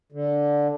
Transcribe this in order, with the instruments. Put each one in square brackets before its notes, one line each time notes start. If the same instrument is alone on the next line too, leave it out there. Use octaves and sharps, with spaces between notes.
[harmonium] D3